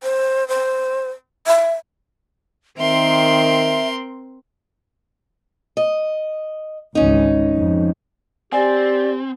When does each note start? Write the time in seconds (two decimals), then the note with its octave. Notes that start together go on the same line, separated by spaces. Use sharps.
0.03 C5
0.48 C5
1.47 E5
2.79 D#3 C4 A#4 E5 C6
5.77 D#5
6.95 G#1 C#2 E3 C#4 D#4
7.56 F2
8.53 C4 G4 D5 G#5